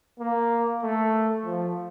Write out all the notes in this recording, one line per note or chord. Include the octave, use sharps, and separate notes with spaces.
A#3
A3
F3